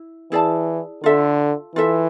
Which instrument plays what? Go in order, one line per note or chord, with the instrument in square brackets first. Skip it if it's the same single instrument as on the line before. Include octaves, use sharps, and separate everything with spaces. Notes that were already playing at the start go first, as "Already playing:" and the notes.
Already playing: [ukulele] E4
[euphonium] E3 [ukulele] E4 G#4 D5 A5
[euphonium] D3 [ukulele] F4 A4 E5
[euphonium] E3 [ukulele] F4 A4 E5